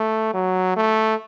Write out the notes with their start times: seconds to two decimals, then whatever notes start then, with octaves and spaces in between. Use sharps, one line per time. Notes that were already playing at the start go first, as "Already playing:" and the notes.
Already playing: A3
0.34 F#3
0.77 A3